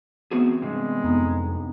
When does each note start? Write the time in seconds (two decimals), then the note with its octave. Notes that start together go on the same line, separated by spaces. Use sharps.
0.31 E3 B3 C4 F#4 G#4
0.62 G2 C3 G#3
1.04 F2 B3 D#4